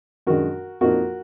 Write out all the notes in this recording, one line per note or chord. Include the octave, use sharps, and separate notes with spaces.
F#2 D#3 G#3 D4 F#4 A#4
F2 F3 A#3 D#4 F#4 A#4